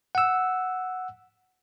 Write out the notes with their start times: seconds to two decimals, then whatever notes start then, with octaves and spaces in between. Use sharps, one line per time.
0.15 F#5 E6